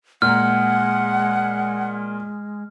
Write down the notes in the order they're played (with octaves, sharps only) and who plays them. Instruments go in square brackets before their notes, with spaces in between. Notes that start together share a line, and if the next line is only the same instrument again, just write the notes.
[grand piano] A#2 A#5 [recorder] G#3 [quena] F#5 [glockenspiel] F6